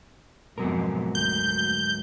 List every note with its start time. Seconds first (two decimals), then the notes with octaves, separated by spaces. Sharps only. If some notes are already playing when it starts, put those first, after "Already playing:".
0.58 F2 G#2 B2 F#3 A#4
1.15 D2 G6